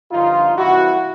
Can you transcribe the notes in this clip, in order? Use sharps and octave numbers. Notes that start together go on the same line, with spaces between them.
G2 D3 F3 D#4 F4
C2 C3 E3 E4 F#4